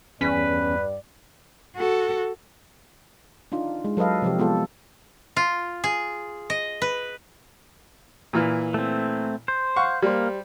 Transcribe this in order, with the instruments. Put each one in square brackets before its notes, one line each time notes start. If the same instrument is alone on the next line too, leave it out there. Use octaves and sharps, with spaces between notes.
[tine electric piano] E2 B6 [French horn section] G2 D5 [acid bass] C#4 [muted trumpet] B4
[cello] F#4 A4
[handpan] D4 D#4 F4
G#3
F#3 A4 B4 D#5 F5
C3 F3 G4
G#3 B3 F4 A4
[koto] F4
G#4
D#5
B4
[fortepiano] A#2 E3 F6
[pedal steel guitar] A3 C4
C5
[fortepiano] F5 F#5 C#6
[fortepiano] G3 C5 [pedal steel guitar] A#3